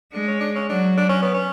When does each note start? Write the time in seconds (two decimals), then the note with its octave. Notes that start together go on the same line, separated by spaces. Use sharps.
0.13 G#3 D4
0.27 C#4
0.40 D4
0.55 C#4
0.69 F#3 D4
0.97 D4
1.09 C#4
1.22 B3
1.34 C#4